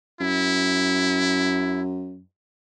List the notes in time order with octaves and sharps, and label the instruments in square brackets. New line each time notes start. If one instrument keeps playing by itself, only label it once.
[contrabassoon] F#2 [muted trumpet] E4